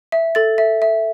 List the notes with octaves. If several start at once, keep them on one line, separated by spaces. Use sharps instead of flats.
E5
A4 A6
E5
E5